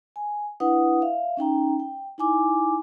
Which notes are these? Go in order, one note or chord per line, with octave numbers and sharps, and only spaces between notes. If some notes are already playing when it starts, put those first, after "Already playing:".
G#5
D4 E4 B4 F#5 D#6
E5 F5
C#4 D#4 G5 A#5
G5
D#4 E4 G#5 D6